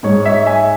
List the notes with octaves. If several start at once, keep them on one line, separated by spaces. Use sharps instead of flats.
G#2 G#3 C#5
C#5 E5
E5 G#5